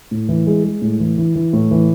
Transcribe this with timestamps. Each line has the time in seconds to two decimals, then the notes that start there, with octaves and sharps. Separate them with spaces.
0.11 A2
0.29 E3
0.47 G#3
0.64 G#3
0.82 A2
1.00 E3
1.18 E3
1.35 E3
1.53 A2
1.71 E3